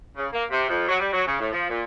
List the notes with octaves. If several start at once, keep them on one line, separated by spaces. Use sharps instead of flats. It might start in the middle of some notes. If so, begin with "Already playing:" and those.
C#3
A#3
C3
F2
F#3
G3
F#3
C#3
A2
F3
A#2